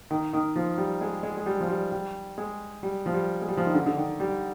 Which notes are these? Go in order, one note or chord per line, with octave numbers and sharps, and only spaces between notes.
D#3
D#3
F3
G3
G#3
G#3
G#3
G3
F3
G3
G3
G#3
G3
F3
G3
G#3
G3
F3
D#3
D3
D3
D#3
G3